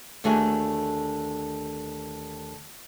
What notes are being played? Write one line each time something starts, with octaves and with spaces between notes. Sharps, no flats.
D#2 D3 A3 F#4 G#4 G#5